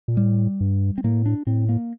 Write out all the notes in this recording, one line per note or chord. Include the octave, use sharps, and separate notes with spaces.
A#2
A2 G3
G2
C4
A2 A#3
D4
A2 C4
A#3